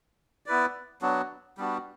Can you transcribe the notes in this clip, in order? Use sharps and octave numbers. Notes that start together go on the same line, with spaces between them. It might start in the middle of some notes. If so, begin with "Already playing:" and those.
B3 E4 B4 D5
F#3 B3 D4 F#4
G3 B3 D4 F#4